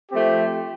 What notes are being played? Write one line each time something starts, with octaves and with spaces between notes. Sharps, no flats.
F3 A3 C4 G4